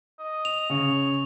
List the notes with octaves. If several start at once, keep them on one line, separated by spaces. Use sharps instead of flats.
D#5
F7
C#3 C#5